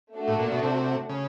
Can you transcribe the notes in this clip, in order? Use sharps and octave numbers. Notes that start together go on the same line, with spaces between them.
A3 D4 F#4
A2
A#2
B2
C3
C#3